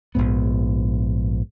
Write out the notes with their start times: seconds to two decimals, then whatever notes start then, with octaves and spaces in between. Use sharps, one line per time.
0.15 A#1 E2 G#2 B3